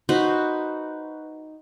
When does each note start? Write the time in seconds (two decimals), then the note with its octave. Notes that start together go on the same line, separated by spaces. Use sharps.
0.09 D#4 F#4 B4 C5